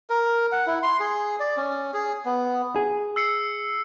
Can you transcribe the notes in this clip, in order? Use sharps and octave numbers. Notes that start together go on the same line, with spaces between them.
A#4
F#5
E4
C6
G#4
D5
C#4
G#4
B3
G#4
E6 C7 C#7